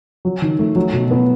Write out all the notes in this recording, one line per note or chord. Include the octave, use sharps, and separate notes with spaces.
F#3
D#3
A3
F#3
B2
B3